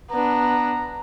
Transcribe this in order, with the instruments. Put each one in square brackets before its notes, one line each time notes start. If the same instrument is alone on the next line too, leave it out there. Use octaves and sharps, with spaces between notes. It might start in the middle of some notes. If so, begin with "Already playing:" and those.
[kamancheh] B3 D4 [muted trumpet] A#5